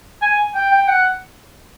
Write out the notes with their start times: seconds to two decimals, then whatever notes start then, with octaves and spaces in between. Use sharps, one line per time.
0.22 G#5
0.55 G5
0.72 G5
0.88 F#5